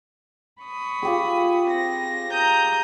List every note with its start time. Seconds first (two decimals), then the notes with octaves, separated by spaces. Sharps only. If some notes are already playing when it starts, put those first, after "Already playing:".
0.62 B5 C#6 D#6
1.02 F4 G4 G#4
1.68 C4 A#6
2.31 A#5 D#6 G6